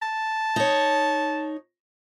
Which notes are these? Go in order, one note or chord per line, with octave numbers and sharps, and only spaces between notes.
A5
D#4 C#5